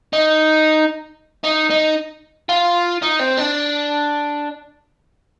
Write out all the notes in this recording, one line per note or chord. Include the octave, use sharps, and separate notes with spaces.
D#4
D#4
D#4
F4
D#4
C4
D4